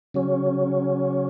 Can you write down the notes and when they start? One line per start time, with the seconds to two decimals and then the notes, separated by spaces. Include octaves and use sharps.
0.14 C#3 F#3 C#4